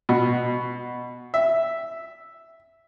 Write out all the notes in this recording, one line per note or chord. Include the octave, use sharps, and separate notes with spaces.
B2
E5